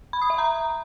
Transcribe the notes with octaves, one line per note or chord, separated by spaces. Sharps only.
B5
D#6
E5
A#5